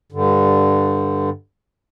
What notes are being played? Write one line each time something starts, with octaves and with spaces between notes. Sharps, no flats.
G2 D3